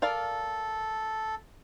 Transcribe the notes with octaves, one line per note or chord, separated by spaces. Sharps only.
A4 A#4 D5 F5